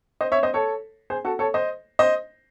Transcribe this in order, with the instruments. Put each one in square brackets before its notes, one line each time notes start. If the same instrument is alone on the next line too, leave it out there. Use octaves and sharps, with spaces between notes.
[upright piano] C5 D#5
C#5 E5
C5 D#5
A4 C#5
G#4 C5
F#4 A4
A4 C#5
C5 D#5
C5 D#5